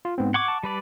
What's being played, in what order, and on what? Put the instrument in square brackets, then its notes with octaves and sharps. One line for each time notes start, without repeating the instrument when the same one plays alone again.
[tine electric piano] F4
G#2 B3 C4
[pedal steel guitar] F#5 C#6 D6 [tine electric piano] G#6
[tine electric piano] A5
[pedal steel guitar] G3 B4 D5